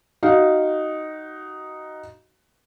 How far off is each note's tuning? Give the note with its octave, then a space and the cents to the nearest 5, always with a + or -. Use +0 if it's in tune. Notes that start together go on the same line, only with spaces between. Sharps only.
D#4 +0 F#4 +20 F5 +0